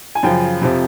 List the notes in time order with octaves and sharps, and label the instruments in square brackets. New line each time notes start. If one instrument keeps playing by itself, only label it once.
[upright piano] G#5
F#2 C#3 F3 G5
F2 C3 F3